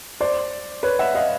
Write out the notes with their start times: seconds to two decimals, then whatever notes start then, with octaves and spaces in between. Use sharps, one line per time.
0.21 C5 D5
0.83 B4 C#5
0.99 E5 F#5
1.15 D#5 F5